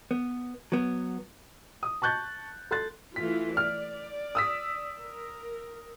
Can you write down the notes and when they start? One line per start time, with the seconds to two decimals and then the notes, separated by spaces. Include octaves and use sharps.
0.11 B3
0.72 F#3 B3
1.83 D#6
2.02 A5 C#6 F#6 G6 A6
2.71 A4 C6 F#6 A6
3.16 E3 A3 F4 B6
3.57 D5 F6
4.35 D#6 E6 B6
5.02 A#4